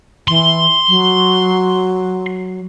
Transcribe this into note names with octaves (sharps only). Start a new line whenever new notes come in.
E3 C6
F#3